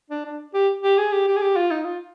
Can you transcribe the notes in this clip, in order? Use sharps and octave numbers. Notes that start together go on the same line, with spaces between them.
D4
D4
G4
G4
G#4
G4
G4
G#4
G4
F4
D#4
F4